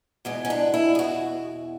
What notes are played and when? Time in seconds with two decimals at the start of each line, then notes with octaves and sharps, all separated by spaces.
0.25 E2 B2 G#3
0.45 C#4
0.50 D4
0.74 E4
0.95 G#4
0.99 F#4